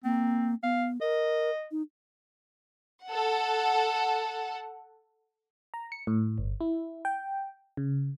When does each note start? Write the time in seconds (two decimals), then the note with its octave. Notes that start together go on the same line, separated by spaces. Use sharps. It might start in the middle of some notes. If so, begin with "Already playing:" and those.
0.04 A#3 C4
0.63 B3 F5
1.01 A#4 D#5
1.71 D#4
3.08 A4 F#5
5.74 A#5
5.92 C#7
6.07 A2
6.38 G1
6.61 E4
7.05 G5
7.77 C#3